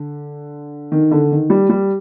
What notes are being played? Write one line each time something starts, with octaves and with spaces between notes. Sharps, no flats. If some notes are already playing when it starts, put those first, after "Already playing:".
Already playing: D3
D#3
D3
D#3
G3
G3